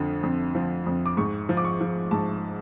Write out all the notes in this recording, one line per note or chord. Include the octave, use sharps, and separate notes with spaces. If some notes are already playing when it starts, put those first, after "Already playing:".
Already playing: F2 D3 F3
F2
F3
F2
D6
G#2 C#6
F3
D6
C#6
F3
G#2 A5